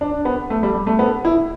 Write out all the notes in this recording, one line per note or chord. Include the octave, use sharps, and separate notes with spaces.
D4
B3
A3
G3
G3
A3
B3
E4